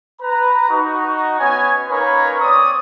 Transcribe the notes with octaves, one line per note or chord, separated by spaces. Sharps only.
B4 A#5
D#4 F#4
B3 C#4 C#5 D#5 G#5
A#3 C#4 D#4 A#4 B4 C#5
C4 C#5 D5 D#6